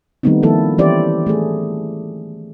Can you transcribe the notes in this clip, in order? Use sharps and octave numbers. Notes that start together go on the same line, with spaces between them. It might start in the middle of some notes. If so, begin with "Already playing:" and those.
D#3 G3 A3 B3 C4 D#4
D#3 F3 A#3 E4 A4
E3 C#4 E4 G4 C5 D5
A3 G#4